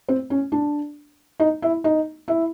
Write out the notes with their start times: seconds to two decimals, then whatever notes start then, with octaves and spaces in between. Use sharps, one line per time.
0.09 C4
0.30 C#4
0.52 D4
1.40 D#4
1.62 E4
1.84 D#4
2.28 E4